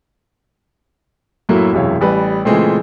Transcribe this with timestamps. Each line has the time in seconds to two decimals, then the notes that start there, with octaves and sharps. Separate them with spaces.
1.49 F#2 A2 F#3 A3 A#3 E4
1.73 E1 F#2 C3 E4 C#5 F5
2.01 A1 G3 B4
2.45 A#2 C#3 E3 G#3 A3 C4